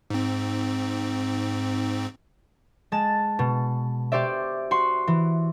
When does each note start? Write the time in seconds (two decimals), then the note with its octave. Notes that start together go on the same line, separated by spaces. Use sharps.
0.10 G#2 C4
2.92 G#3 A5 A6 E7
3.39 B2
4.12 F#4 G4 C5 D5 E5
4.71 F#4 C6
5.07 E3